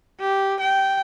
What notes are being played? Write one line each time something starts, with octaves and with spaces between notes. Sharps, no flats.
G4
G5